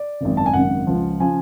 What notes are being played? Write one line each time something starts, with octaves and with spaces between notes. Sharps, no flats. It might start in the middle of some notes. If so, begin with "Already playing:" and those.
Already playing: D5
G#1 F#2 C#3
A5
G#5
G#1 F#2 C#3 F#5
C#2 C#3 F3
C#3 F3 G#5